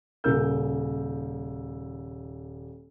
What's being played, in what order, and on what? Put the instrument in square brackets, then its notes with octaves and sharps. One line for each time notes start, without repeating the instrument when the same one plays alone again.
[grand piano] D#1 C#3 A#4 E6 G6